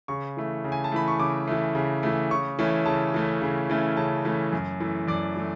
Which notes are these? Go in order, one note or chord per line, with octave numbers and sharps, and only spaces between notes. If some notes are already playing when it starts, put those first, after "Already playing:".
C#3 C#6
E3 A3
C#3
G#5
A5
E3 A3 B5
C#6
C#3 D6
E3 A3
C#3
E3 A3
C#3 C#6
E3 A3 C#4
C#3 A5
E3 A3 C#4
C#3
E3 A3 C#4
C#3 A5
E3 A3 C#4
F#2
E3 A3
F#2 D5
E3 A3